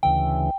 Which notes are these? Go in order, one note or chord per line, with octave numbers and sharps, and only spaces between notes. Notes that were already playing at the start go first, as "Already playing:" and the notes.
D2 C#3 E3 G5